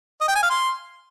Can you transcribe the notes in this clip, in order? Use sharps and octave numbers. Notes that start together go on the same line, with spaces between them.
D#5
G5
G#5
F5
C6